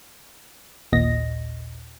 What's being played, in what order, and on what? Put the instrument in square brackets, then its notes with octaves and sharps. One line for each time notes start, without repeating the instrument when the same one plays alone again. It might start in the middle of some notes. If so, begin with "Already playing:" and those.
[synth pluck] A1 D#2 A#2 D#5 A#6